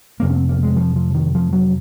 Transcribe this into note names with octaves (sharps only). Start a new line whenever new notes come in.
F1 F2 C3 A#3
C#4
C4
A#3
G#3
F3
F3
D#3
F3
F#3